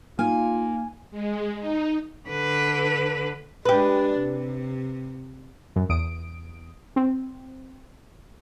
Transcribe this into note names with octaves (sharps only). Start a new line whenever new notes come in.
A#3 D#4 F4 G#5 F6
G#3
D#4
D3 B4
G#3 D4 G4 B4
C3
F#2
E2 D#6 D7
C4